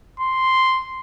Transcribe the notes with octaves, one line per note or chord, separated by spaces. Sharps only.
C6